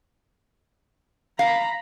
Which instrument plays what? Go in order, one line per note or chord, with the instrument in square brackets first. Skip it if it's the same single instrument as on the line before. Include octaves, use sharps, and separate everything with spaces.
[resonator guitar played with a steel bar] F5 [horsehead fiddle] A#5 B5